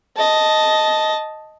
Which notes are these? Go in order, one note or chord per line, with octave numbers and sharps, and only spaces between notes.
D#5 A5